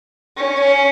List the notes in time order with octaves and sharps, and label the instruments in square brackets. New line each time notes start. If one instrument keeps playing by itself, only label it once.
[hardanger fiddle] C#4